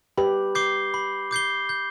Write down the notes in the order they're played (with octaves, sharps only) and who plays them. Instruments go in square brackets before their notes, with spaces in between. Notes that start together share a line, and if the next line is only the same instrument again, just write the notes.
[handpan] G4 B4 [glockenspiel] B5
[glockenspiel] D6 G6 C7 G7
B5
D6 G6 C7 G7
G6